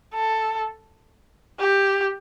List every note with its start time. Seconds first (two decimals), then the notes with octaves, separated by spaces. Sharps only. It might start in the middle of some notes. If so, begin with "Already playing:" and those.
0.14 A4
1.59 G4